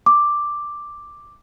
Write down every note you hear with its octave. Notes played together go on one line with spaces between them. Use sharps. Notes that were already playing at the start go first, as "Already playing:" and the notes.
D6